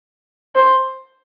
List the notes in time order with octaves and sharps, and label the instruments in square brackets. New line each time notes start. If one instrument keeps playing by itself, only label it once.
[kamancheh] C5